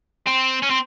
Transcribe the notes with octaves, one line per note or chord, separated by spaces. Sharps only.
C4
C#4
C4